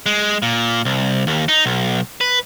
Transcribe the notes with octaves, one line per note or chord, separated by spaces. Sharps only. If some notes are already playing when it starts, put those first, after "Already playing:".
G#3
A#2
C2
D#2
D#4
B1
B4